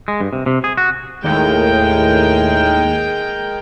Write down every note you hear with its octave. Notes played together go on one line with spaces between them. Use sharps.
G#3
G2
C3
C3
G#4
F#4
D#2 A2 G#3 A#4 G5